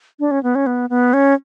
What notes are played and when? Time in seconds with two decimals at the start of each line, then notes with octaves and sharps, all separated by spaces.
0.20 D4
0.31 C#4
0.43 B3
0.55 C#4
0.67 B3
0.90 B3
1.13 C#4